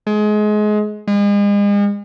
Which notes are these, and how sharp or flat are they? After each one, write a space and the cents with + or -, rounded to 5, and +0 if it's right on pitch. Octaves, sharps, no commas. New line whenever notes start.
G#3 +25
G#3 -40